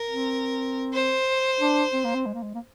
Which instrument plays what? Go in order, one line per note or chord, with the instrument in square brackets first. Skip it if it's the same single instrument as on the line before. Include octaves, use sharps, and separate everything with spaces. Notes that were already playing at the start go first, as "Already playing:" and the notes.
Already playing: [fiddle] A#4
[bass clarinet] C4
[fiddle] C5
[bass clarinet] D4
C4
A#3
C4
G#3
A#3
G#3
A#3